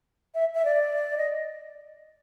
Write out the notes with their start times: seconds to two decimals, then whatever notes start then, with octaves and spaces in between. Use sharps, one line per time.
0.35 E5
0.55 E5
0.65 D5
1.18 D#5